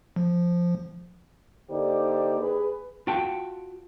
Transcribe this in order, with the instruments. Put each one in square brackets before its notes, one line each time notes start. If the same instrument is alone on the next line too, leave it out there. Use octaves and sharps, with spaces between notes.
[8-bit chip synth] F3
[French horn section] D3 A#3 D#4 G4 C5 D5
G#4 B4
[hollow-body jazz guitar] F4 F#4 G5 A5